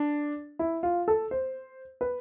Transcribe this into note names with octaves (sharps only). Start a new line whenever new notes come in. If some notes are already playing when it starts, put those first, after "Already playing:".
Already playing: D4
E4
F4
A4
C5
B4